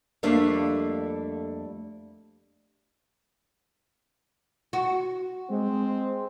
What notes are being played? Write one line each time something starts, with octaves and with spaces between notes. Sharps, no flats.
F2 G3 A3 A#3 D4
F#4
G#3 C4